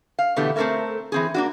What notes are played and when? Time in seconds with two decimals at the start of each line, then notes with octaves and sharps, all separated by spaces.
0.19 F5
0.36 B2 D3 E3 A3 B3 G4
0.56 A3 C4 C#4 A4 A#4 E5
1.12 E3 C4 G#4
1.34 A#3 D4 F#4